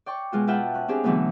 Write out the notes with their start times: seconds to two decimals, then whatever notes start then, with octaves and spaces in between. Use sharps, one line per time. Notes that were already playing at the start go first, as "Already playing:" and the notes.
0.06 D5 G5 C#6
0.32 B2 G#3 F4 F#4
0.47 F4 B4 E5 F#5 G5 A5
0.74 C#4 F#6
0.88 C4 D4 G4 G#4
1.04 B2 D3 E3 F#3 A3 B3